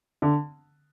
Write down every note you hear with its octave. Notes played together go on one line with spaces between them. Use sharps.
D3